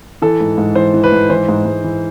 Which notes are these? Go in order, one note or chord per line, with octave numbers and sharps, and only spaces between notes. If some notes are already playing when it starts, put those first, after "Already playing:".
E3 A4
G#2
G#2
E3 C5
E3
B4
G#2
E3 C5
G#2
G#2
E3